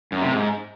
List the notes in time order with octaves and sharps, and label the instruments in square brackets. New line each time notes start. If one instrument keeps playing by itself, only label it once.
[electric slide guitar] F#2
C3
G#2